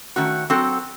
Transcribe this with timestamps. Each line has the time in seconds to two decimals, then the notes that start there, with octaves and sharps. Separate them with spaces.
0.16 D#3 A3 C#4 F#4
0.50 F#3 C4 F#4 A4